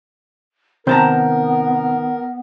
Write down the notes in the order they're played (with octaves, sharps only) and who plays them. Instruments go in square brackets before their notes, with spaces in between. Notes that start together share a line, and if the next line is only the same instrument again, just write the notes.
[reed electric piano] C3 C4 G6 [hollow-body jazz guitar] D#3 A5 A#5 [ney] B3 [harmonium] A#4